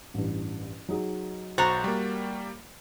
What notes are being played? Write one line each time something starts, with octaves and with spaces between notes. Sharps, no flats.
A1 G2 E3
F#3 D#4 G#4
B1 F#4 C5 A#5 A6
G3 A#3